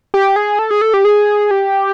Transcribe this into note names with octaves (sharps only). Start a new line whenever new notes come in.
G4
G#4
A4
G#4
A4
G4
G#4
G4